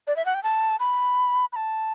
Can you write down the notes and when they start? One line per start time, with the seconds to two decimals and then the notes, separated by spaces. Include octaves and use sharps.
0.07 D5
0.16 E5
0.26 F#5
0.34 G5
0.43 A5
0.80 B5
1.53 B5
1.56 A5